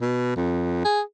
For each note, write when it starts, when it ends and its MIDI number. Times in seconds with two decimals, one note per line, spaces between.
0.01 0.31 47
0.36 0.80 41
0.85 1.01 68